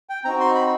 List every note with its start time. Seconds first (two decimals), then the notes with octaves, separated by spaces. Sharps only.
0.09 G5
0.25 C4 D#4 F#4 A#5
0.40 C6
0.55 B5